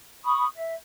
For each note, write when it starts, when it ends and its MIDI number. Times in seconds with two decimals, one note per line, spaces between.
0.24 0.45 83
0.24 0.45 85
0.24 0.45 87
0.55 0.73 76